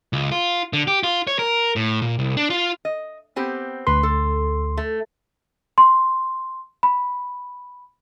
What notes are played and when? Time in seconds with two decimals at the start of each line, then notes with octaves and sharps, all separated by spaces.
0.13 C#2
0.31 F4
0.73 D3
0.87 G4
1.03 F4
1.27 C#5
1.39 A#4
1.76 A2
2.02 A#2
2.19 C2
2.37 D4
2.50 F4
2.85 D#5
3.36 B3 C4 G4
3.87 D2 B4 C6
4.03 A4
4.77 A3
5.78 C6
6.83 B5